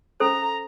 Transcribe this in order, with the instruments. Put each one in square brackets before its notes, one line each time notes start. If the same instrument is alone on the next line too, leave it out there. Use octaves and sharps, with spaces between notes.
[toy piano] C#4 A4 C5 [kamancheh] A#5